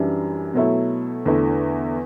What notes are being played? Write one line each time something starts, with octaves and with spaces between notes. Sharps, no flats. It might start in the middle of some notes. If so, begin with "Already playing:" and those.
Already playing: F#2 E3 G3 D4
B2 F#3 A3 E4
E2 D3 A3 E4